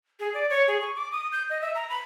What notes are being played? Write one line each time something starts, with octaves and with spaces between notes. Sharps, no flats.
G#4
D5
C#5
G#4
C#6
D6
D#6
G6
D#5
E5
A#5
B5